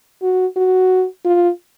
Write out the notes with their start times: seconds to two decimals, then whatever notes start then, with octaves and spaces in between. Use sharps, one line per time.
0.22 F#4
0.57 F#4
1.25 F4